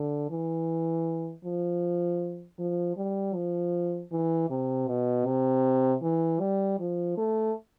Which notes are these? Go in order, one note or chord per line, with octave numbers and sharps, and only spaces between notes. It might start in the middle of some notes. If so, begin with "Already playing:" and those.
Already playing: D3
E3
F3
F3
G3
F3
E3
C3
B2
C3
E3
G3
F3
A3